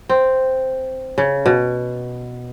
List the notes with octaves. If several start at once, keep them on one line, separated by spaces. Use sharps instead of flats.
C4
C#3
B2